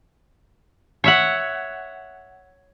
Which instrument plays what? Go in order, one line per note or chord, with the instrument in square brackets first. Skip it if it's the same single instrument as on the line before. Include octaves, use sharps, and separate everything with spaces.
[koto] C#5 E5 F#5